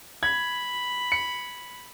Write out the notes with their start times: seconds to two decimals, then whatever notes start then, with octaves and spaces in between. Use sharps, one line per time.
0.23 B5 G#6
1.12 C#7